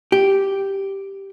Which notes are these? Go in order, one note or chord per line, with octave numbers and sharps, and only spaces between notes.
G4